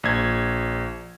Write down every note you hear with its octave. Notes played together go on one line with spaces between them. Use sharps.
A#1 G#6